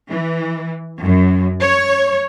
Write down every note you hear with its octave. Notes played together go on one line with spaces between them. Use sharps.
E3
F#2
C#5